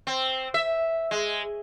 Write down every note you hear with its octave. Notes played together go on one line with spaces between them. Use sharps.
C4
E5
G#3